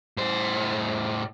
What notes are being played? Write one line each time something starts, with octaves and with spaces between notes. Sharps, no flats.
A2 C5